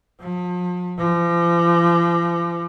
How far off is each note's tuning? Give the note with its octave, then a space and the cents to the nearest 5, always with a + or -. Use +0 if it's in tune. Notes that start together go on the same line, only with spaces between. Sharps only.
F3 +40
F3 -40